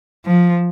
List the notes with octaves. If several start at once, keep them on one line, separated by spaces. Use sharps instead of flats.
F3